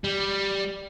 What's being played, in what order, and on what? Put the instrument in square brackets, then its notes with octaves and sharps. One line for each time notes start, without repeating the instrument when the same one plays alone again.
[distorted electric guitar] G3